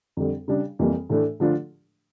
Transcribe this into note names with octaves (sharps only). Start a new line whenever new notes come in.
F2 D3 G3
C#3 G3 D4
F2 E3 G3 A#3
A2 E3 A3 D4
D3 F3 A3 D4 F4